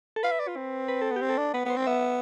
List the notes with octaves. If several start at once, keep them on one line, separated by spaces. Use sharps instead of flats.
A4
B4 F5
E5
D5
F4
C4
B4
A4
B3
C4 G4
A4
D4
B3 B4
B3 C5
C4
B3 E5